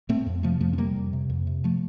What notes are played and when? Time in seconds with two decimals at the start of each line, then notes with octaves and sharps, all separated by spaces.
0.09 A2 A3 C4
0.26 F2
0.43 C3 F3 A3
0.60 F2 F3 A3
0.73 C4
0.78 C3 G3 A#3
0.96 F2
1.13 C3
1.30 F2
1.47 C3
1.64 F3 A3